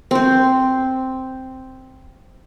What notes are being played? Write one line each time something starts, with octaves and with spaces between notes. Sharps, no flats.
C4 C5